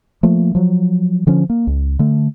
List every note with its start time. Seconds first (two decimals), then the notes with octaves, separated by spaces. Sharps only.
0.23 F3 A3 A#3
0.55 F3 F#3
1.27 D3 F3 C#4
1.50 A#3
1.67 C#2
1.99 D3 A3